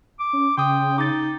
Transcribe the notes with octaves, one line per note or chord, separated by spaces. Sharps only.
D6
C#4
C#3 G5 C6 D#6
D#4 D6 A6